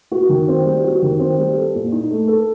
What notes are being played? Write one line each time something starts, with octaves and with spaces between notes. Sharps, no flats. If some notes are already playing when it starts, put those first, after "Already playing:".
F#4
D#3
C4
G3
F#4
D#3
C4
G3
A4
A#2
D#4
A3
A4